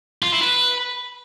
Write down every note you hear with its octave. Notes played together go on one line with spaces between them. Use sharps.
F4
E4
B4